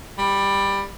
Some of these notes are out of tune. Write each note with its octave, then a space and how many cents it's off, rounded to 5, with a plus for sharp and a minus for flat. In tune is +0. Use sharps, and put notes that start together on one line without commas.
G3 +10